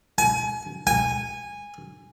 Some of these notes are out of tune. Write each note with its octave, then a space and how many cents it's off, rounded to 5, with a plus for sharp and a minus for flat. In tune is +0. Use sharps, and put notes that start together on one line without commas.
G#5 +30
G#5 -15